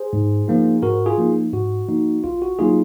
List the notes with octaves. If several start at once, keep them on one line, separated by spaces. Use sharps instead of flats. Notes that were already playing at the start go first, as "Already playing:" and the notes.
Already playing: G#4 C5
G#2
F3 A#3 D#4
G#2 F#4 A#4
F4 G#4
F3 A#3 D#4
G#2 F#4
F3 A#3 D#4
A#1 F4
F#4
F#3 A#3 D#4 F4 G#4